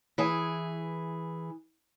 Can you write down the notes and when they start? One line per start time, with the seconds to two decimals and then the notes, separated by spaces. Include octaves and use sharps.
0.18 E3 G#4